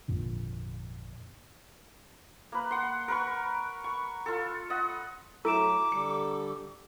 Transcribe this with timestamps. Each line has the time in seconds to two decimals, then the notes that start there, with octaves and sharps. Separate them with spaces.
0.08 G#1 F2 A#2 D3
2.52 A#3 B4
2.71 F#5 C6
3.08 A#4 B4 C#6
3.84 C#6
4.26 F4 A4
4.70 D#5 F#5
5.45 F#3 A3 E4 A4 A#5 D6 D7 E7
5.92 D3 G3 A4 C#7